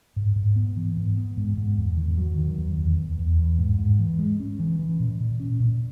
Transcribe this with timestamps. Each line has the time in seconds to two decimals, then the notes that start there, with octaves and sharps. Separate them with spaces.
0.16 G#2
0.36 G#2
0.56 B3
0.77 E3
0.97 G#2
1.17 B3
1.37 G#2
1.57 G#2
1.77 E2
1.97 D#3
2.18 F#3
2.38 D#3
2.58 E2
2.78 E2
2.98 E2
3.19 E2
3.39 E3
3.59 G#2
3.78 G#2
3.99 E3
4.19 G#3
4.40 C#4
4.60 E3
4.79 E3
5.00 A#2
5.20 A#2
5.40 C#4
5.60 A#2